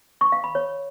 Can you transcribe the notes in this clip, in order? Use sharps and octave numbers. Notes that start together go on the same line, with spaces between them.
C#6
F5
B5
C#5